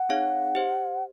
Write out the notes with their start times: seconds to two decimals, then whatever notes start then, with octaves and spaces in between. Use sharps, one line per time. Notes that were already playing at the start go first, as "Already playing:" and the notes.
Already playing: F#5
0.09 C4 D#4 G#4 C#5 F5
0.55 G4 C5 D#5